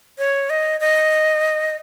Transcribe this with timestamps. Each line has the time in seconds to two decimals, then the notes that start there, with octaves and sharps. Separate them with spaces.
0.18 C#5
0.50 D#5
0.80 D#5